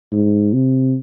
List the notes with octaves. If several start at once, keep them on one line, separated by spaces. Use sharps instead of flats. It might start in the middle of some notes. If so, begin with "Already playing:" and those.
G#2
C3